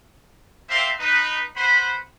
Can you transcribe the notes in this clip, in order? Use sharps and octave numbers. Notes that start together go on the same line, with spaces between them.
A#3 C4 C5 E5 F5 C6
D#4 B4
B4 C5 F#5 B5